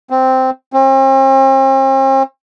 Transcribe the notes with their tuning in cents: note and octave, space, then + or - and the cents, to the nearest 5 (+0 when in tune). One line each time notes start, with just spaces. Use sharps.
C4 -5
C4 +45